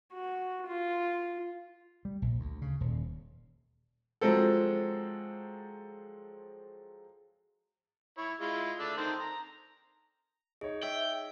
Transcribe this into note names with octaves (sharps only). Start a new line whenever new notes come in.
F#4
F4
G3
A#1
D2
C#3
D#1
F3 F#3 G#3 C4 A4
E4 C#5
G#3 E4 F4
A3 D4 E6
D#3 C4 A4
A#5
D#4 G#4 C#5
E5 G5